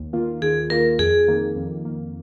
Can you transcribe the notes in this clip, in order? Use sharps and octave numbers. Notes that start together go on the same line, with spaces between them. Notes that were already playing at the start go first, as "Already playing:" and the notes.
Already playing: D#2
D#3 A#3 F4
D#2 G#4
D#3 A#3 F4 A#4
F2 G#4
D#3 A#3
F2
D#3 A#3